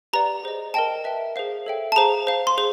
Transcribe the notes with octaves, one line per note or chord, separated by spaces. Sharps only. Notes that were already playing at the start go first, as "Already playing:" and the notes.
G4 B4 D5 F#5 A#5
G#4 C5 D#5
A#4 D#5 G5 A5
B4 E5 G5
G#4 C5 F5
A4 C#5 E5 G5
A5
G#4 C5 F5 A#5
C5 F5
C6
G#4 C5